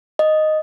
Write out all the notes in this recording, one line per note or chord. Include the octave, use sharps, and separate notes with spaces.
D#5